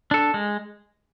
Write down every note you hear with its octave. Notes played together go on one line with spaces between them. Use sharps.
D4 A4
G#3